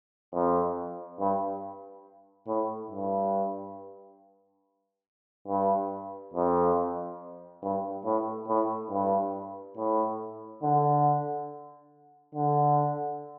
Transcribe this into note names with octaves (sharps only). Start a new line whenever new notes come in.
F2
G2
A2
G2
G2
F2
G2
A2
A2
G2
A2
D3
D3